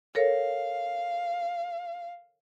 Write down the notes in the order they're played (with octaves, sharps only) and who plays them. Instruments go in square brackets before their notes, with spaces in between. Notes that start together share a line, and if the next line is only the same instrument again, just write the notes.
[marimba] A4 A#4 C#5 [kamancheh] F5